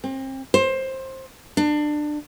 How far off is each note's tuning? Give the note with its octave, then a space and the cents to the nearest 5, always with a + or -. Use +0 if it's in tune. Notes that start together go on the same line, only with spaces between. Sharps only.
C4 +30
C5 +20
D4 +25